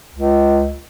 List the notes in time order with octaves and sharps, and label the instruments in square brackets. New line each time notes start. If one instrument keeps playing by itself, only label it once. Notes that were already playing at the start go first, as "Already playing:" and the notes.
[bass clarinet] C#2